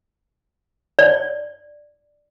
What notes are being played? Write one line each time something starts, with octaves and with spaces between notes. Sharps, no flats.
D5